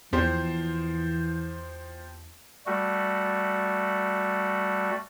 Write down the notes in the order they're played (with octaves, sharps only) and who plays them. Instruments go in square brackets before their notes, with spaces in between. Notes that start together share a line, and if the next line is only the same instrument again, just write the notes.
[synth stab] E2 [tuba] E3 [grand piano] F3 G4 C5
[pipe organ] G3 A3 F#4